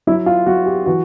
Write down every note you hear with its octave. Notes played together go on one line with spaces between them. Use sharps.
F#3 E4
F4
F#3 F#4
G4
E3 F#4